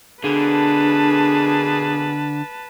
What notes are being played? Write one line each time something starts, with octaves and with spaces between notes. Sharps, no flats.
B2 D3 A#3 D4 G#4 B4 A5